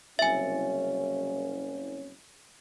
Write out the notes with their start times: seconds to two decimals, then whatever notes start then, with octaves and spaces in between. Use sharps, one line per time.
0.19 F#1 C2 C#4 E5 G#5